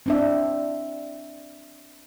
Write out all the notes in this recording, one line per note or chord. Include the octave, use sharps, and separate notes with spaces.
C4 D4 E5